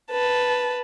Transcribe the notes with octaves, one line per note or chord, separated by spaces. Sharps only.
B4 A5